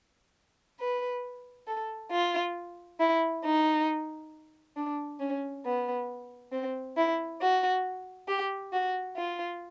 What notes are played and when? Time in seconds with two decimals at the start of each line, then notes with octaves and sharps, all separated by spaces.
0.80 B4
1.67 A4
2.11 F4
3.00 E4
3.45 D#4
4.77 D4
5.20 C#4
5.65 B3
6.52 C4
6.97 E4
7.41 F#4
8.28 G4
8.73 F#4
9.17 F4